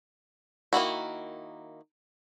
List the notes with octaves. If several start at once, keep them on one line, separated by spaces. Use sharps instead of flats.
D#3 A#3 E4 F#4